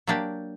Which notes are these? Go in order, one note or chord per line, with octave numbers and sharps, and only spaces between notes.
F#3 A#3 D4 G4